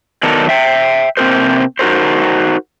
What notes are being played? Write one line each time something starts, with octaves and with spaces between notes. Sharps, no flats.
D#3 F#3 B3 A4 A#4 D5
E5 G5
C3 A#3 C4 G#4 A#4 C5
D#4 F#4 A#4 C5